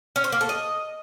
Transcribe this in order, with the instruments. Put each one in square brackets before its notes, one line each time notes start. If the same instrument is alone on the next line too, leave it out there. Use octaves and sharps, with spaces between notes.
[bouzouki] C#4
C5
A#3
A4
D#5